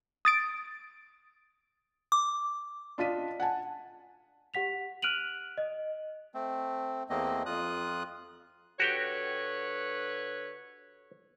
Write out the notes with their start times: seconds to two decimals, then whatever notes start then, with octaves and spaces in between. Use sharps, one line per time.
0.25 D#6 A6 D7
2.12 D6
2.98 D4 F4 D#5 B6 D#7
3.40 F#5 G#5 A5
4.54 G4 F#5 B6 F7
5.02 F6 F#6 D7 D#7 F7 F#7
5.58 D#5
6.34 A3 C4
7.10 E2 A3 A#3 C4 D#5
7.46 F2 F4 D#6 F#6
8.80 D3 F#4 G4 B4 C#5 G5